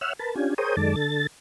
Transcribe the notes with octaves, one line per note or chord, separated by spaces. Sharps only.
C#5 E5 F#5 E6 F6
A#4 B4 A5
C#4 D4 F4 G4 G#5
G#4 A#4 C5 C#5 G5 D#6
F#2 D#3 G#3 A4 D5 A5
D3 A4 A6